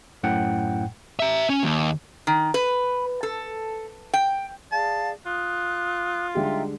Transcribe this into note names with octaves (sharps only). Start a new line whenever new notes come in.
F#2 A2 F#5 G5
E5 A#5
C#4
D#2
D#3
B4
A4
G5
G#4 D5 F5 A5
F4 D#6 F#6
D3 G3 G#3 D#4 E5 G5